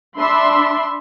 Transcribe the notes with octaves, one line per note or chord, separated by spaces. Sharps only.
D4 E5 B5 C6